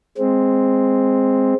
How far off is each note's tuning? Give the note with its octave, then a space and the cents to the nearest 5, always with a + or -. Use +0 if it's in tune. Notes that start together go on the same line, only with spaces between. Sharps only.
G#3 +0 C4 +0